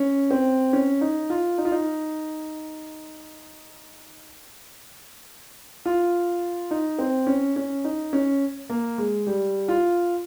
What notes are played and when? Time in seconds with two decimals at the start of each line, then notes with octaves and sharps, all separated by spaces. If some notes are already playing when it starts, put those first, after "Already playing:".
Already playing: C#4
0.31 C4
0.73 C#4
1.01 D#4
1.30 F4
1.58 D#4
1.65 F4
1.72 D#4
5.86 F4
6.71 D#4
6.99 C4
7.27 C#4
7.56 C#4
7.84 D#4
8.13 C#4
8.69 A#3
8.98 G#3
9.27 G3
9.68 F4